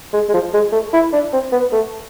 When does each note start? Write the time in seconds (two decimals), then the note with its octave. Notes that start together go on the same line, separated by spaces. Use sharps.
0.13 G#3
0.29 G#3
0.34 F3
0.53 G#3
0.73 A3
0.93 E4
1.13 D4
1.33 C4
1.52 B3
1.72 A3